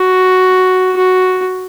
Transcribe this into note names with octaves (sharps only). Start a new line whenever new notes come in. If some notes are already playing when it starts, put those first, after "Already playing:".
Already playing: F#4
F#4